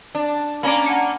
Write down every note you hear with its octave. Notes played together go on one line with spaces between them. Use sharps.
D4
A#3 C#4 D4 A#5 B5 D6 D7
F#5 G#5 C#7